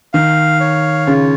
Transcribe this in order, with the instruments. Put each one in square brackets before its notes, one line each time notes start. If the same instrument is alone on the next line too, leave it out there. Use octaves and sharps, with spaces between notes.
[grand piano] D#3 [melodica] F5
[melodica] C#5
[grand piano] C#3 [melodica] F4